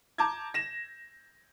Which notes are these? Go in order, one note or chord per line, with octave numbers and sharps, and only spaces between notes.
A5 A#5 D6 G6 G#6
A#6 E7